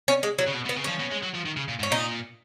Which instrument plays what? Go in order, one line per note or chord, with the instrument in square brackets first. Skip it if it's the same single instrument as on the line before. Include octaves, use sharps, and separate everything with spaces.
[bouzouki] C#4
G#3
F#3
[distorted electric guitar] C#3
B2
B2
[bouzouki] B3
[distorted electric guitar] C#3
[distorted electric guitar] F3 [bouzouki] C#4
[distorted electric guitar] B2
G#3
F#3
F3
D#3
C#3
A#2
G#2
[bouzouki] C#4
[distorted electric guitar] A#2 [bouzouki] D#4